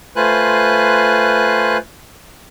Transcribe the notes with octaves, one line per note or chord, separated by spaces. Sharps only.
A3 F4 B4 C5 G#5 F#6